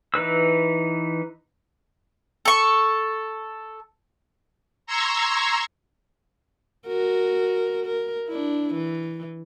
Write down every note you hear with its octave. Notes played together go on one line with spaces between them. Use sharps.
E3 D#4 B4 E6
A4 C#6
A#5 C6 C#6 E6 G#6
F#4 A#4
A#4
D4 E4
E3